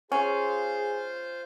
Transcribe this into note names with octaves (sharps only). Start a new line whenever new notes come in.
C#4 F4 G#4 C5